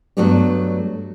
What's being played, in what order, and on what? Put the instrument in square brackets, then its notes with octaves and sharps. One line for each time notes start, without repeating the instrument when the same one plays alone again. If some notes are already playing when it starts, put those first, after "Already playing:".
[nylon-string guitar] G2 F#3 G3 A3 B3 D4